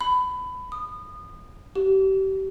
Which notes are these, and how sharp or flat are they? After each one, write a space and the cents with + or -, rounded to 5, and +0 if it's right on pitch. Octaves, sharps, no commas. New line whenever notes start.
B5 +20
D#6 -25
G4 -30